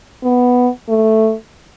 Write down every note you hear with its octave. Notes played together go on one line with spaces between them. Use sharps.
B3
A3